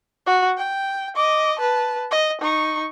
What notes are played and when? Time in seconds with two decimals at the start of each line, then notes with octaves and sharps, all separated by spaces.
0.26 F#4
0.57 G5
1.15 D#5 D6
1.59 B4 A5
2.11 D#5
2.41 D#4 C#6